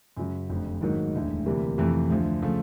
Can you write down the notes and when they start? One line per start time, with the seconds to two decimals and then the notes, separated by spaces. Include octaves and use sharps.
0.17 F#2 C#3 F#3
0.49 F1 F2 D3
0.81 G#2 D#3 F#3 A#3 D#4
1.13 E1 D2 D3
1.46 D2 C3 E3 G3 A#3
1.78 F2 C3 E3 A3
2.10 D2 D3 F3
2.42 C#3 F3 A3